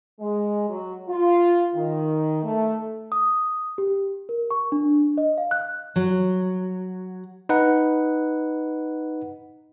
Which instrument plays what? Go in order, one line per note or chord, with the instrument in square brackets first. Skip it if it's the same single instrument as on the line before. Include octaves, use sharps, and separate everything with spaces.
[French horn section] G#3
F#3
F4
D#3
A3
[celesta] D#6
G4
A#4
C#6
D4
D#5
F5
F#6
[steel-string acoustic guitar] F#3
[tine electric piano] D#4 B4 F#5